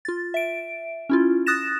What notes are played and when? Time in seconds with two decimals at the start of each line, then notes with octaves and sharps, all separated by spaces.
0.05 F4 A6
0.34 E5 D7
1.09 C#4 E4 F4
1.46 D#6 F#6 A6 A#6 E7